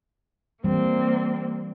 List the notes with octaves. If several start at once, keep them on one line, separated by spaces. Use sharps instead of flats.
E3 G3 A#3 C4